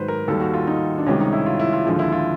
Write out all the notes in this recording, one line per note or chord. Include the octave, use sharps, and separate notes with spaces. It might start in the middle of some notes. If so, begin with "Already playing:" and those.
Already playing: G#2 D#3 F#3 B4 C5
A#4
D#2 D#3 G3 A4
F#4
F4
D#4
D4
C#2 C3 D#3 G3 C#4
D#4
E4
F4
E4
F4
D#2 D3 F3 G#3
E4
F4